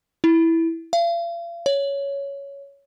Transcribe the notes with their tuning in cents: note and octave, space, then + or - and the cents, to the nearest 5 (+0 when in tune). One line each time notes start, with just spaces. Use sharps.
E4 -5
F5 -40
C#5 +10